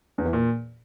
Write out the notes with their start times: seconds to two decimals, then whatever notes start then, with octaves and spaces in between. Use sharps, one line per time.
0.18 E2
0.26 E3
0.33 A#2